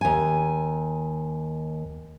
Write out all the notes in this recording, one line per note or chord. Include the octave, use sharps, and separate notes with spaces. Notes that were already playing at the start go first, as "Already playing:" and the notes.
D#2 G#5